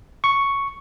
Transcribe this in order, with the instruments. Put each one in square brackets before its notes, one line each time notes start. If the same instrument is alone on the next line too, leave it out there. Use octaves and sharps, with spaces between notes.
[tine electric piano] C#6